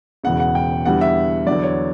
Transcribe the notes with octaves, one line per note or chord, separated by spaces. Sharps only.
E1 E2 C#3 F#5
F#5
G5
E2 D3 G3 F#5
E5
E2 D3 F#3 D5
C#5